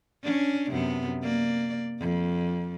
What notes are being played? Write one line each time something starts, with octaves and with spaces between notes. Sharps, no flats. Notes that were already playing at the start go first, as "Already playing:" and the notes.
C#4 D4
F#2 C3 B3
A#3 D5
F2